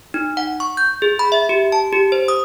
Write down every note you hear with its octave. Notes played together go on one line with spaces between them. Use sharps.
D#4
F#5
C#6
G6
G#4
B5
E5
G4
A5
G4
C5
D#6